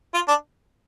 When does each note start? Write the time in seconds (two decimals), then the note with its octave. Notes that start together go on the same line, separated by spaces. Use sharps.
0.14 F4
0.28 D4